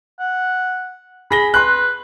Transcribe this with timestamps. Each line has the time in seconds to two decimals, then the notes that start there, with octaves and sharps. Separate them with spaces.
0.20 F#5
1.31 G#4 B5 A#6 G7
1.54 B4 C6 F#6